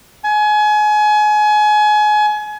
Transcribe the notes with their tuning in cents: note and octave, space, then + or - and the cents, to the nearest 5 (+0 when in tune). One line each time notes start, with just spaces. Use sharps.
G#5 +30